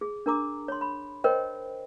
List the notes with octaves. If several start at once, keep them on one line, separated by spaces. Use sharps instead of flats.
G#4
D4 A#4 A#5 D6
C#5 C6
B5
A#4 C5 C#5 D#5 G5